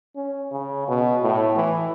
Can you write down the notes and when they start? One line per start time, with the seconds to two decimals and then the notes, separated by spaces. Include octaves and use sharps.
0.16 C#4
0.51 C#3
0.88 B2
1.23 A2
1.56 E3